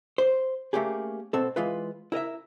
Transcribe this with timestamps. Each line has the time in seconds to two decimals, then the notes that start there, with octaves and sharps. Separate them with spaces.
0.18 C5
0.73 A3 A#3 C#4 G4 G#4
1.33 B2 C4 A4
1.56 E3 G#3 F4 B4
2.12 E4 A#4 D#5 E5